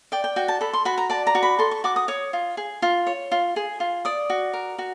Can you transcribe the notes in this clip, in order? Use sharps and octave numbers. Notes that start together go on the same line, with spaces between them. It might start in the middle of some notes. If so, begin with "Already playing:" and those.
D5 G5
G5
F#4 G5
A5
A4 B5
C6
F#4 B5
A#5
D5 A5
A#5
F#4
B5
A4 C6
C#6
F#4 D6
D#6
C#5 D#6
F4
G#4
F4
C#5
F4
G#4
F4
D5 D#6
F#4
A#4
F#4